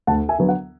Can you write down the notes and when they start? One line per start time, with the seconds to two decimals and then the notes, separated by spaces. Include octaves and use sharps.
0.07 D2 F#5 A5
0.29 E5 G#5
0.38 D3 F#3 B3
0.49 F#5